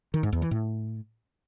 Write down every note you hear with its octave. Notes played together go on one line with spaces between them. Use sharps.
D#3
G#2
E2
E3
A2